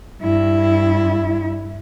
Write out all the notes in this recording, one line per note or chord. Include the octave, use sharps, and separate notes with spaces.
G2 E4